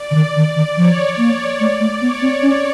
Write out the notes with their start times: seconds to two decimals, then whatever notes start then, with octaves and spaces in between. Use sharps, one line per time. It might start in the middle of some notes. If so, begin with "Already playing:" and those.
Already playing: D5
0.11 D3
0.15 D#3
0.36 D#3
0.56 D#3
0.76 F3 C#5
1.18 A#3
1.60 A3 D5
1.80 A3
2.01 B3 C#5
2.22 C4
2.42 C#4